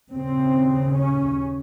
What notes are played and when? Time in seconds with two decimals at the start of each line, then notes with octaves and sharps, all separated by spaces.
0.13 D#2 C#3 C4
0.94 C#4